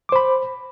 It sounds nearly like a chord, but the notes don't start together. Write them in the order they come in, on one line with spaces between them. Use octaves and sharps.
D6 C5 B5